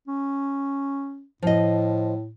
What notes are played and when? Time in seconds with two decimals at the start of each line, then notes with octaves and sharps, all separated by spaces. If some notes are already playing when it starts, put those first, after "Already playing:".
0.08 C#4
1.42 A2 F3 D#5